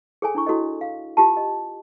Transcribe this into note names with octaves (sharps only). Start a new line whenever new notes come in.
G#4 A4 C#5 G5 G#5
D4 E4 C#6
E4 F#4 A4 C#5 D#5
F5
F4 G4 A5
D#5